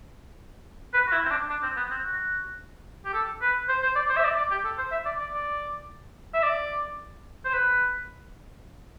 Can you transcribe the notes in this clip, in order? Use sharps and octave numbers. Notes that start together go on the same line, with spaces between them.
B4
F#4
E4
C4
D4
D4
C4
B3
C4
F#4
G4
A4
B4
C5
C5
D5
C5
E5
D5
D5
G4
A4
C5
E5
D5
D5
D5
E5
D5
C5
B4